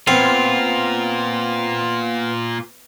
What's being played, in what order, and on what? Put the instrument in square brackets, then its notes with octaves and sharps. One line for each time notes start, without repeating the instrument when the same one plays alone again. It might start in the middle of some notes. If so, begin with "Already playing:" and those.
[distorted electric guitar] A#2 [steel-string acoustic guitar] B3 [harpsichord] C4 [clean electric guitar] F4